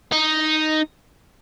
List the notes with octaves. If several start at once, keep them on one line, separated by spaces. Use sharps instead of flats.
D#4